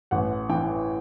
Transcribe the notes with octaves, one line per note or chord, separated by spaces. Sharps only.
A1 F#5
E3 G5